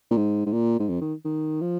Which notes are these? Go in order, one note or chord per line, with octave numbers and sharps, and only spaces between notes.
A#2
G#2
G#2
A#2
G#2
F2
D#3
D#3
F3